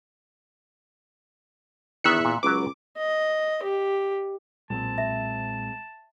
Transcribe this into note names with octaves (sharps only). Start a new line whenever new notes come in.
E2 D#3 B3 D4 E5 F#6 C#7
A#2
C#2 F#3 A#4 B4 D6
D#5
G4
B1 A#2 G#3 C4 C5 A5
E5